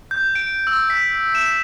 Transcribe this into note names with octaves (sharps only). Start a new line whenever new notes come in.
G6
D7
E6
B6
E7